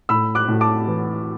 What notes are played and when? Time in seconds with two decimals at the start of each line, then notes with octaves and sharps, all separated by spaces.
0.09 A2 B5 E6
0.35 D6 F#6
0.48 A2
0.61 A5 D6
0.88 E3